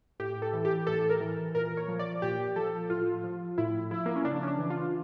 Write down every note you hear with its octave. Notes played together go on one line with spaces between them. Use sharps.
A2 G4
A4
E3
G4
A2 A4
A#4
E3
A#2 A#4
C#5
F3
D5
A#2 G4
F3 A4
A2 F4
F3
A2 E4
F3 E4
A#3
C#4
C#3 D4
C#4
D4
E3
F4